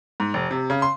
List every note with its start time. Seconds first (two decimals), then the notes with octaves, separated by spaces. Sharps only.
0.20 G#2
0.34 F1
0.51 C3
0.70 C#3
0.82 C6